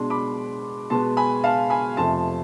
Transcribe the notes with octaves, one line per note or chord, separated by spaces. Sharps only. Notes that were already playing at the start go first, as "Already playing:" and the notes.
Already playing: B2 G#3 D4 C6
B5 D6
B2 G#3 B3 A5 C6
G#5 B5
F5 A5
G#5 B5
F2 C3 F3 A3 A5 C6